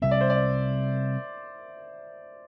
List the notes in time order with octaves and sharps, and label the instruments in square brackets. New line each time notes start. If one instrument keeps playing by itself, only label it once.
[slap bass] C3 G3 C4 [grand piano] E5
[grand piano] D5
C5
D5